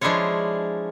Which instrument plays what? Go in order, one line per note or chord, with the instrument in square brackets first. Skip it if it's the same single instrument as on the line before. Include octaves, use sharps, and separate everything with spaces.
[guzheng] F3 G#3 D4 E4 F4 C#5